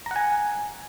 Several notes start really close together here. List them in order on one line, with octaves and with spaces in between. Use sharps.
A#5 F#5 G#5